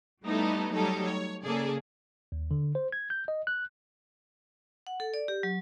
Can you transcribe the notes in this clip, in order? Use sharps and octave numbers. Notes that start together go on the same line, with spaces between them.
G3 A3 B3 D#4 E4 A4
F#3 G3 A3 D#4 A4 C#5
C#5
C#3 A#3 G#4 A4 D5
D#2
D3
C5
G#6
G6
D#5
F#6
F#5
A4
D5
G4
F#3